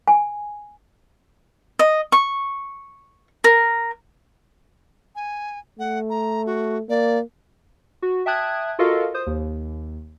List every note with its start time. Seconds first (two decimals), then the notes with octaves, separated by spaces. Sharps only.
0.08 G#5
1.79 D#5
2.12 C#6
3.44 A#4
5.16 G#5
5.80 A3 F#5
6.10 A#5
6.46 F#4
6.90 A#3 D5
8.02 F#4
8.26 E5 G5 A5 D#6 F#6 G#6
8.79 F4 F#4 A4 A#4 D#5 F5
9.14 C5 D#6
9.27 D#2